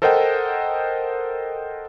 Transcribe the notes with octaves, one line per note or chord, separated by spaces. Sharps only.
A4 A#4 C5 D#5 F#5 G5